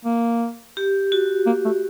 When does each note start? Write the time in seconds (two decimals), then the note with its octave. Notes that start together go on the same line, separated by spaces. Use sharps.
0.05 A#3
0.77 G4
1.12 F#4
1.47 A#3
1.65 A3